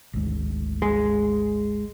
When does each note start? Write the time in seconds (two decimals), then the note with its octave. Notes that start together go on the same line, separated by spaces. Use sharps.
0.13 G#1 D2 G#2
0.82 G#3